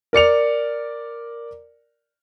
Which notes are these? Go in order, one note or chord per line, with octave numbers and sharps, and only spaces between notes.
A#4 D5 C#7 F7